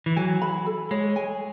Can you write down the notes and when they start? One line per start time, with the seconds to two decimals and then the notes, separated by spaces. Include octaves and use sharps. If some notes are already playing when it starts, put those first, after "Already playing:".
0.06 E3
0.16 F#3 G#5
0.42 B5
0.66 A4
0.91 G#3 C#5
1.16 G#5